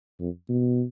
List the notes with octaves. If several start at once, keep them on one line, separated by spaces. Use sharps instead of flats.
F2
B2